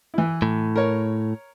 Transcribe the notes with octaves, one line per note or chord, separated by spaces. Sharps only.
E3 E4
A2
A#4 C#5